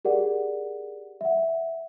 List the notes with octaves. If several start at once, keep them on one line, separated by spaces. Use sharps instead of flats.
G4 G#4 A#4 D5 F#5
E5 F#5